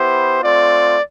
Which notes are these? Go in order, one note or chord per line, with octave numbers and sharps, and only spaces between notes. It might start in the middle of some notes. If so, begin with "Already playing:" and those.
Already playing: B3 E4 G4 C5
A3 C4 F4 D5